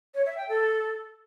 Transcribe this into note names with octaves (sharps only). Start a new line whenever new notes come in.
C#5
E5
G5
A4